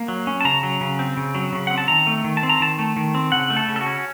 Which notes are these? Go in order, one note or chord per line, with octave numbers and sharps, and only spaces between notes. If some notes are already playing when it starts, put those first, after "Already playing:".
Already playing: A#3
F#3
C#4
A5
C#3 A#5
F#3
C#3
C4
C#3
F#3
C#3
C4 F#5
A5
D#3 A#5
A3
D#3
A5
C4
A#5
D#3 A5
A3
D#3
C4
C#3 F#5
A3
A4
C#3
A4
F#4
C#4